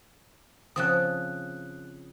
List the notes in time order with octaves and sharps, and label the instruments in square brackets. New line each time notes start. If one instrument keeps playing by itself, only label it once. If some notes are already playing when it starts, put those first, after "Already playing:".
[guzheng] C#3 F3 C4 [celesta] D#6 F#6